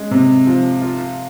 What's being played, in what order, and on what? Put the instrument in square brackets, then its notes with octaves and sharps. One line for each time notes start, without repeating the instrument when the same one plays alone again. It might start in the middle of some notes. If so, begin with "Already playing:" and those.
Already playing: [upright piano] G#3 C#4
C3
F3
F4